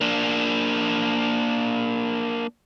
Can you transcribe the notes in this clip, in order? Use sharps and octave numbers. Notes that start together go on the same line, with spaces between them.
A#3 D4